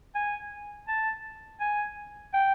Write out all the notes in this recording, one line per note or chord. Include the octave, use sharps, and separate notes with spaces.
G#5
A5
G#5
G5